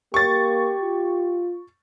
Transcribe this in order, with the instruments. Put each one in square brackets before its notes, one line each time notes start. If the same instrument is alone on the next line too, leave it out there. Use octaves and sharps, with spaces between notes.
[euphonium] A#3 [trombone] G4 [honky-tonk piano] C#6 A6
[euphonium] F4